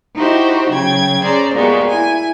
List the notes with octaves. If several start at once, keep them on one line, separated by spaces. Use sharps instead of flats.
D#4 E4 F#4 G4 C5
C#3 F#3 G5 G#6
C#4 G#4 C5 D5 A#5
A#2 G#3 B3 F#4 G4
E4 G#5